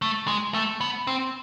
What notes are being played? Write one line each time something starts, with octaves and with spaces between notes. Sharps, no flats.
A3
G#3
A3
B3
C4